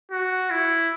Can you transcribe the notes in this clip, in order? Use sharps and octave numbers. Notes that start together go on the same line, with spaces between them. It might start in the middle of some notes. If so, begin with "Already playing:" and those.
F#4
E4